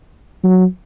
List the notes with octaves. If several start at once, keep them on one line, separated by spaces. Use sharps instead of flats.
F#3